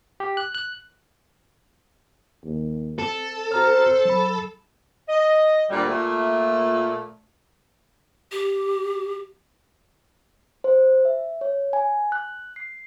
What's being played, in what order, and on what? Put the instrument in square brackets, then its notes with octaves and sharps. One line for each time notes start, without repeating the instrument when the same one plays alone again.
[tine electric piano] G4
F#6
F#6
[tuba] D#2
[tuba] C4 [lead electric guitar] A4
[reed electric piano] F#4 A#5 F6 [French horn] C5
[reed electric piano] F#3 B5
[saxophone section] D#5
D2 A#2 G3
A#2 A3
[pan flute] G4
[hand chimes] C5
E5
C#5
G#5
F#6
C7